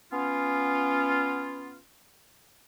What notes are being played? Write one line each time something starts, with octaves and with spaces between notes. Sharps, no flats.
B3 C#4 F4